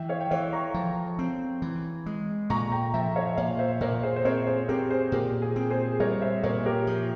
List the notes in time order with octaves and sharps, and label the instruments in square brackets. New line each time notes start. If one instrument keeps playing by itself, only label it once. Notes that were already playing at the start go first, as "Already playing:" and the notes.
Already playing: [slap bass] E3 [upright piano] E5 G5
[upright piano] C#5 F5
G5
[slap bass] E3 [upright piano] C#5 F5
[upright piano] A#5 C#6
[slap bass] F3
C4
E3
G#3
[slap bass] A#2 [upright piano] A#5 C#6
[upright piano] G5 A#5
[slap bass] F3 [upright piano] E5 G5
[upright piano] C#5 F5
E5
[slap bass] A#2 [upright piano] C#5 F5
[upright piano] C5 E5
[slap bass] A#2 [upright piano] A#4 C#5
[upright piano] G#4 C5
C5
[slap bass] C4 [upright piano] A#4 C#5
[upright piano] G#4 C5
[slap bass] C4 [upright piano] G4 A#4
[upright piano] G#4 C5
[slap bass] A#2 [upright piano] G4 A#4
[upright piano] G#4
[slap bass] C4
[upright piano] G#4 C5
[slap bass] G3 [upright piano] A#4 C#5
[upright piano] C5 E5
[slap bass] A#2 [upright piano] A#4 C#5
[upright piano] G4 A#4
[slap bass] F3